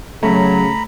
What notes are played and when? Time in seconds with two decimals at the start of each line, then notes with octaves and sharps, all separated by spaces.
0.23 C#3 F#3 A3 A#5 B5